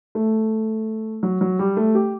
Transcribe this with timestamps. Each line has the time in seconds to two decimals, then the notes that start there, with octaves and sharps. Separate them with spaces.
0.15 A3
1.23 F#3
1.41 F#3
1.59 G3
1.77 A3
1.95 G4